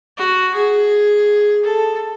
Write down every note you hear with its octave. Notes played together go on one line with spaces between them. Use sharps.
F#4
G#4
A4